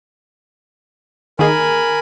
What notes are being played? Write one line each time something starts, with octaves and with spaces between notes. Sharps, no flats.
D#3 A#3 G#4 A#4 G#5 B5